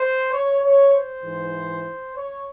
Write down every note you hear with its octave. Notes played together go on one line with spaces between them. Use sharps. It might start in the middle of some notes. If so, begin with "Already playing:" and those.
Already playing: C5
C#5
C#5
C5
G#2 E3
C#5